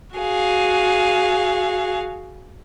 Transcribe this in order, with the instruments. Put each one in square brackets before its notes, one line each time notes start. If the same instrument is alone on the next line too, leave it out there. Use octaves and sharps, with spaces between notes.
[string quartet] F#4 G#4 F5